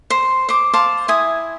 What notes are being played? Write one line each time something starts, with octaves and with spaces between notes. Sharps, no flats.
C5
C5 D6
C5 F5 A5 D6
E4 G#5 D#6